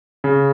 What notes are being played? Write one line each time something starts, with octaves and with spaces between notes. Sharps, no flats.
C#3